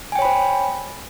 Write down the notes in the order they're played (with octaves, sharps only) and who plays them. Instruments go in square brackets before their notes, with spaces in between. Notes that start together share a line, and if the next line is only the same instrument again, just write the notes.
[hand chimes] G#5
G5
C#5
B5
C5